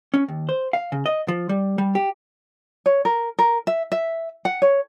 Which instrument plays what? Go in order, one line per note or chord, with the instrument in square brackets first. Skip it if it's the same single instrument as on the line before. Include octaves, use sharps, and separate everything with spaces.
[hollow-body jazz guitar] C#4
D#2
C5
F5
C#3
D#5
F3
G3
G3
G4
[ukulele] C#5
A#4
A#4
E5
E5
F#5
C#5